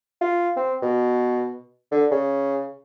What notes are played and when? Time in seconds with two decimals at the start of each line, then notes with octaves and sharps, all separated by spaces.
0.21 F4
0.57 C4
0.82 B2
1.92 D3
2.11 C#3